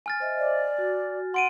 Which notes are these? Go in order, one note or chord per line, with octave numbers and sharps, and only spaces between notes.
G#5 F6 A6
C5 D#5 E5
D5
F#4
F#5 C6 D7 D#7